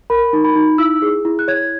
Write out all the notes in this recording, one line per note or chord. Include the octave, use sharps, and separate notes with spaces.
A#4 B5
D#4
B5
D#4
E4 E6
G#4
E4
F#6
C#5 G#6